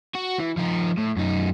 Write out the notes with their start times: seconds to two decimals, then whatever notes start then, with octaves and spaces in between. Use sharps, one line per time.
0.15 F#4
0.39 E3
0.57 F3 D#4
0.97 A2
1.16 F#2 D#4